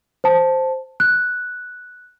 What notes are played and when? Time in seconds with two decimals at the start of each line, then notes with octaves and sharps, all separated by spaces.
0.24 C5 A5
1.00 F#6